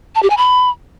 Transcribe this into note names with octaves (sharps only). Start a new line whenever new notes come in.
A5
G4
G#5
B5